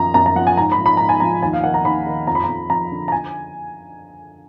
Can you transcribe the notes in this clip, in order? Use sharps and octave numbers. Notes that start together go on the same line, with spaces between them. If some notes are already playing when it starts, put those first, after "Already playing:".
Already playing: F#2 D#3 F3 A#5
F#2 A#5
A#5
F3 F#5
G#5
G#2 A#5
B5
F3
B5
G#2 A#5
G#5
F3 A#5
D#2 G#5
F5
D#3 F#5
A#5
D#2 B5
D#3
F2 A#5
B5
F2 A#5
F3 A#5
D3
A#5
G#5